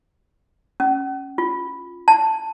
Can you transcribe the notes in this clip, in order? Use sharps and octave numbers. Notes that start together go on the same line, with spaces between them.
C#4
F4
A5